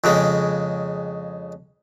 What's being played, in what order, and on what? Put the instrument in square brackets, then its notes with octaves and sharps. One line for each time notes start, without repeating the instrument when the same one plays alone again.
[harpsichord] F2 C#3 G#3